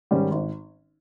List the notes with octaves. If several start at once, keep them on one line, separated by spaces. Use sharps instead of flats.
G#2 D#3 G3 C#4
G#1